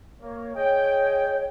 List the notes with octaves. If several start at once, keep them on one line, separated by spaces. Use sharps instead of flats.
A#3 C#5
G#4 C#5 D#5 G5